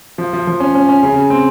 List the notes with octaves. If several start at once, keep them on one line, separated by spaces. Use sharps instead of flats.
F3
F3
F3
C#4
C#4
C#4
C#3
C#3
C4